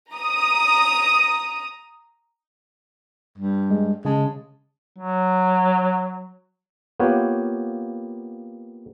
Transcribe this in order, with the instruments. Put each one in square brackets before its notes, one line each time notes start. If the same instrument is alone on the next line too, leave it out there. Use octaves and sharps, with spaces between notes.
[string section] A#5 D#6
[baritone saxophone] G2
[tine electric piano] G#3
[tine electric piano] C#3 A5 [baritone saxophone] G#3
[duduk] F#3
[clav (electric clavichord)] A#3 B3 F4 G4 C#5 F#5